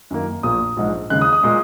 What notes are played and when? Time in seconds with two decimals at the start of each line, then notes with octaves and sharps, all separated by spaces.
0.10 F#2 D#3 A#3
0.43 A#1 A#2 A#3 D#6
0.77 A#1 G#2 G#3
1.10 D#2 C#3 G#3 F#6
1.21 D#6
1.33 D#6
1.43 A#2 G#3